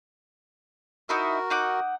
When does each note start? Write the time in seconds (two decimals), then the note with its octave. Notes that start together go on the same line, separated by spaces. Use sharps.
1.09 D#4 E4 F#4 A#4 E5
1.50 D#4 F#5 D6